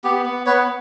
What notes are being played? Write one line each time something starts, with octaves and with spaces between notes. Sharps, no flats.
B3 G4
B3
B3 B4 C#5